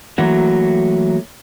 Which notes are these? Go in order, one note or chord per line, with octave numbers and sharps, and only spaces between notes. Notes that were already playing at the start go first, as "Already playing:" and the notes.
E3 F#3 A3 A#3 F#4